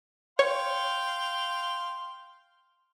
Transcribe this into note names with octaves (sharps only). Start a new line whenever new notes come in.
C#5 F5 G5 C6